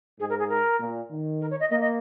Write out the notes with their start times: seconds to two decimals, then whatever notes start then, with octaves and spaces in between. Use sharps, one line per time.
0.19 G#2 G#4
0.30 A#4
0.39 G#4
0.49 A#4
0.79 A#2
1.10 D#3
1.41 A#4
1.51 C#5
1.60 D#5
1.70 A#3 D#5
1.81 D#5